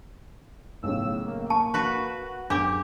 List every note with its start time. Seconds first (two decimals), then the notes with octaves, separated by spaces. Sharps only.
0.83 B1 A2 C#3 E6
1.25 A#3
1.50 A5 C#6
1.74 F#4 B4
2.50 F#2 D4 G4 G#4 D6